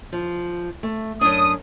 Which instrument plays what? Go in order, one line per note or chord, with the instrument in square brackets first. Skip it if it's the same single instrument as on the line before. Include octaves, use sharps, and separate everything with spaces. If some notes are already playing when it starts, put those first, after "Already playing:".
[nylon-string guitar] F3
A3
[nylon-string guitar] F#2 D4 [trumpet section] D#6